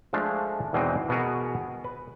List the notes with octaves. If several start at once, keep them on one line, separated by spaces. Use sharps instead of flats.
F3 G#3 A3 D4 F5
E2 B2 E3 G#3 C4 D#4
B2 B3 F#4 G#4 A#4
B4